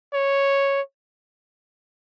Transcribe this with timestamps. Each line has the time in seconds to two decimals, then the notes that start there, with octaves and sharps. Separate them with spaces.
0.14 C#5